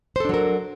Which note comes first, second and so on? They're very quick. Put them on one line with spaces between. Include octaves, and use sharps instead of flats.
C5 A4 D4 F#3 A#4